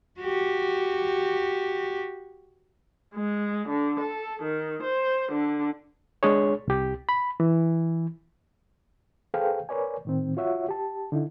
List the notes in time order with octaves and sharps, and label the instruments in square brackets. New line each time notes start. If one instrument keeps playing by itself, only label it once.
[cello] F#4 G4
[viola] G#3
D3
A4
D#3
C5
D3
[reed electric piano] G#3 D4 G#4 C#5
C2 G4
B5
E3
G#4 A4 B4 C5 F5 G5
A#4 B4 C#5 D5 G#5
A2 D#3 C4
F4 F#4 C#5 E5 F#5
G4 A5
D3 D#4 E4